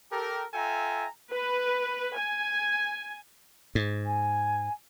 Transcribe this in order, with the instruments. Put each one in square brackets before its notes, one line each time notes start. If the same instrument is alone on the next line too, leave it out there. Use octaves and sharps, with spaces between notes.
[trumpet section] G4 A4 A#4
F4 A4 E5 G5 G#5 A#5
[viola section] B4
G#5
[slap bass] G#2
[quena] G#5